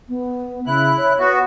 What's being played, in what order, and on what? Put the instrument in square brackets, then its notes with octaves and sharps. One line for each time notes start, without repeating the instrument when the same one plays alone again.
[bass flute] B3
[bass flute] C#3 [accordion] E4 F#6
[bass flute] C#5
[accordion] B3 F#4